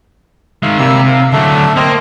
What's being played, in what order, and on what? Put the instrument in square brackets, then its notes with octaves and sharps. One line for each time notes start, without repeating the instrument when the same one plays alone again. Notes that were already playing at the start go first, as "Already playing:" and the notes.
[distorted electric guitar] D#3 G#3 [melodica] E5 F5
[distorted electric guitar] C3 [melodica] G3 A#3 E6
[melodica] F5
[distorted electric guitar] D3 F#3 [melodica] A3 D4 E5
[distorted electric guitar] A#3 [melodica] C4 C5 D#5